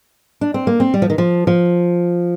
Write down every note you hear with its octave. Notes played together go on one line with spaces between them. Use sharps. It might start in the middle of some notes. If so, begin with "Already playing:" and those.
D4
C4
A#3
C4
G3
F3
D#3
F3
F3